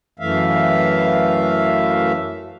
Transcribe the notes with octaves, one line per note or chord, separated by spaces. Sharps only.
F#2 E3 A3 E5 F5